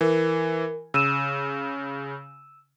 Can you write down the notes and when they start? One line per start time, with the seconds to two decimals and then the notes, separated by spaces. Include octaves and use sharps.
0.01 E3 A#4
0.94 C#3 E6 D#7 E7